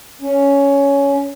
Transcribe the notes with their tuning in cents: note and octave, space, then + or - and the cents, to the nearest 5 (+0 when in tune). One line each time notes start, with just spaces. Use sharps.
C#4 +10